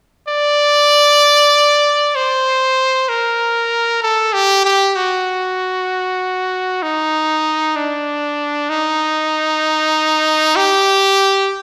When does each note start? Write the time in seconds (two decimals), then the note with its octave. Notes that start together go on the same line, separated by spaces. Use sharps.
0.29 D5
2.15 C5
3.09 A#4
4.02 A4
4.33 G4
4.65 G4
4.96 F#4
6.82 D#4
7.76 D4
8.69 D#4
10.56 G4